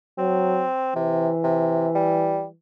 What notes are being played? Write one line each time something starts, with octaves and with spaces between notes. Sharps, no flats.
F#3 C4
C3 E3
C3
G3